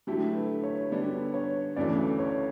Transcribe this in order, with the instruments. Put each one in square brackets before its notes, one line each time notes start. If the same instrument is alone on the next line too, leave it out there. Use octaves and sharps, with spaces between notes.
[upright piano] D3 F#3 A3 E4 G4 [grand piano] A4
[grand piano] B4
C#5
[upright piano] D3 G3 B3 [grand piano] D5
[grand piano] C#5
[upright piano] D2 C#3 E3 A3 [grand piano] D5
[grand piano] C#5